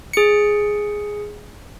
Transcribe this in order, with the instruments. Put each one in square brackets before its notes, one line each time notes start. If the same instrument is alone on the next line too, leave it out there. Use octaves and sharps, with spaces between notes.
[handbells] G#4 C#7